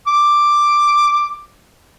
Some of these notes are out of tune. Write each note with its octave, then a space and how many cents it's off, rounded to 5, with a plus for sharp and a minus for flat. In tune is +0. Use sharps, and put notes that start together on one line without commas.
D6 +5